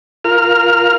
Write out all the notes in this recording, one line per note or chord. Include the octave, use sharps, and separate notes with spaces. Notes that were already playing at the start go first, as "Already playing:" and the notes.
F4 A#4 F6